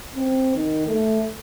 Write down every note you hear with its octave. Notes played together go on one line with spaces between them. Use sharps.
C4
D#3
A3